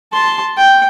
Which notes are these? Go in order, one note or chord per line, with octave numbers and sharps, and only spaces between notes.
A5 C6
G5